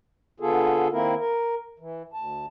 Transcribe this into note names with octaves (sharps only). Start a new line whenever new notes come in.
D3 B3 F4 G#4 A4
D#3 A#3 C4 E4 A#4
A#4
E3
D2 A5